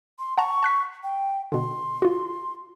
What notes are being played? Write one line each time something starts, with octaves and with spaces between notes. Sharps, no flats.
C6
F#5 A5 A#5 C#6
A5 F#6 B6
G5
B2 D3 C6
F4 F#4